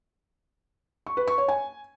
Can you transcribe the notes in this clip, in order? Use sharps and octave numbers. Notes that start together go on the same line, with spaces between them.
C#6
B4
C#6
C#5
G#5